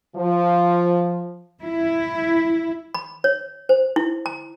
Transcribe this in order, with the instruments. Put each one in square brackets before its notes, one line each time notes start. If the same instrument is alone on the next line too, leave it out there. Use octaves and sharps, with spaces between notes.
[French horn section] F3
[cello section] E4
[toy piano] B5
C#5
C5
E4
A#5